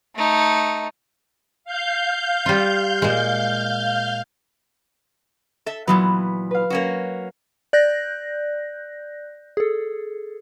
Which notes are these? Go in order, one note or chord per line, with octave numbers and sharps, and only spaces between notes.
A3 D#4
F5 G6
G3 F4
A#2 G#3
A4 E5
A#2 E3 F#3 B3
B4 F5
A#3 C#4 F#4
D5 F#6 G6 A#6
G#4 A4